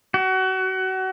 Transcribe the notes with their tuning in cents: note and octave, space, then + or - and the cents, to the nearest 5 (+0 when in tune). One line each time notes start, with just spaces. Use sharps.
F#4 +30